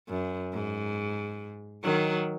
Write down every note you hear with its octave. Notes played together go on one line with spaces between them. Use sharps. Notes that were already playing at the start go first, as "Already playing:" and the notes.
F#2
G#2
D#3 F#3